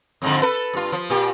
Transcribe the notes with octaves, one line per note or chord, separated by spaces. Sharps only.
F2 G#2 D3
A4 B4
G2 F4
F3
A#2 G4